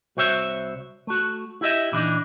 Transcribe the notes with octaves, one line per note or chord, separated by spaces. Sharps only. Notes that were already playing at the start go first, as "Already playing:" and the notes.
C2 F#4 C5 C#5 E5
A3 F#4
E4 G4 D#5 E5
A#2 E3 D4 D#4